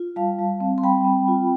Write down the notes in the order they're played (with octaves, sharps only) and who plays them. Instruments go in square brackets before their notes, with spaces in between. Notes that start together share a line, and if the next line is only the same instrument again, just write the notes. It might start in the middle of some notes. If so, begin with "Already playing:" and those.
Already playing: [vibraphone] F4
G3 F5 A5
G3
C4
C6
G3 G5 B5
C4
F4